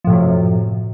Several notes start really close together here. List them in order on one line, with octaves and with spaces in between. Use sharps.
F3 A2 C3 F#2